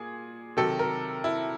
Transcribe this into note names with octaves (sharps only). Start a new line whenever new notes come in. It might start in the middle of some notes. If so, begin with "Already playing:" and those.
Already playing: A#2 G#4
C3 D#3 F#3 A4
A#4
E4